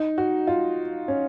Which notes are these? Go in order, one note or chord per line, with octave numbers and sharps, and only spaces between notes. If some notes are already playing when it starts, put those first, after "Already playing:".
Already playing: D#4
F#4
F4
C#4